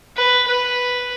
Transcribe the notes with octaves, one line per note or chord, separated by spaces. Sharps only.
B4
B4